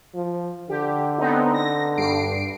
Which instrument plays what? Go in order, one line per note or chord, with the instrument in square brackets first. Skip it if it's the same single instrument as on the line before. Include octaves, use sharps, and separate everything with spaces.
[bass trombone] F3
[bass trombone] D3 [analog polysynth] G4
[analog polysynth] B3 C4 D#4
A#6
G2 C7 D7